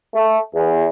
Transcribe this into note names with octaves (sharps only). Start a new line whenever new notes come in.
A3
E2